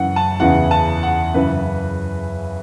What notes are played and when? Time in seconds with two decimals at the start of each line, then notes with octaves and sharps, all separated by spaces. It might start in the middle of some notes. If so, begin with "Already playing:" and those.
Already playing: F#2 C#3 E3 F#5
0.16 A5
0.40 E2 C#3 E3 F#5
0.71 A5
1.03 F#5
1.34 F#2 C#3 E3 B4